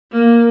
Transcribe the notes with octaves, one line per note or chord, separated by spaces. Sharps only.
A#3